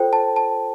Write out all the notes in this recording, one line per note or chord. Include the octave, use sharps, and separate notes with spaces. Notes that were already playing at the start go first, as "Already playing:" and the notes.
Already playing: F4 A4 C5 G5
A5
A5